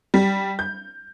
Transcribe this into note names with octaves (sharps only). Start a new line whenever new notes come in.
G3
G6